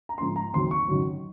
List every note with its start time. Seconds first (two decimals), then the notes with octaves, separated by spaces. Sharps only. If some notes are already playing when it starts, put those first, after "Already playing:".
0.09 A#5
0.18 G#2 F3 A#3 C#4 C6
0.36 A#5
0.53 D#2 D#3 F#3 C4 C6
0.71 C#6
0.88 F#2 D#3 F#3